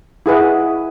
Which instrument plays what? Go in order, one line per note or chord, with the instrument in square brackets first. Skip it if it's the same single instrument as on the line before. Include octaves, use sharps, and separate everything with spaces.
[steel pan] E4 G#4 B4 F#5